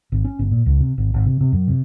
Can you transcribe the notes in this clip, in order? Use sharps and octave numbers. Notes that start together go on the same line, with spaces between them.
G#1
C#4
G1
A#2
C#2
C3
G#1
G#1
C3
C3
F#2
C3